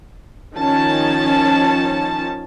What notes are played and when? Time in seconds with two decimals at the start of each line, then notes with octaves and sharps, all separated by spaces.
0.55 D#3 F3 C#4 A5